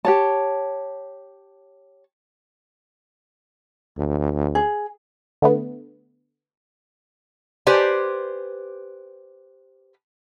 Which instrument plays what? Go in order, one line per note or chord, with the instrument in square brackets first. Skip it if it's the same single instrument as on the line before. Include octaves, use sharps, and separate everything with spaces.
[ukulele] G4 C#5 A5
[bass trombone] D2
[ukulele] G#4
[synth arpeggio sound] D3 A3 B3
[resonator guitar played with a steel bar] G4 B4 C5 D5 G#5